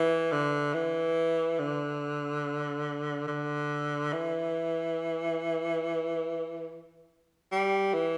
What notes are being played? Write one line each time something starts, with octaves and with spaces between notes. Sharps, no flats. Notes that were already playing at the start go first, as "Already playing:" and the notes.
Already playing: E3
D3
E3
D3
D3
E3
G3
E3